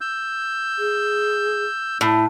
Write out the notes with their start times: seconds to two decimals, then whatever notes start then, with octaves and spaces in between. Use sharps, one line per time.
0.01 E6 G6
0.79 G#4
2.01 A2 E4